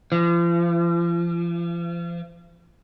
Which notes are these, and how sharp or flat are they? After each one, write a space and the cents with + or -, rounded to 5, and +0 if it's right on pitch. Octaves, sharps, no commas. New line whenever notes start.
F3 -40